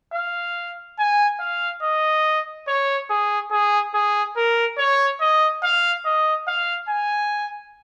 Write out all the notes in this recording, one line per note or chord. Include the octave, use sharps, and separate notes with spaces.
F5
G#5
F5
D#5
C#5
G#4
G#4
G#4
A#4
C#5
D#5
F5
D#5
F5
G#5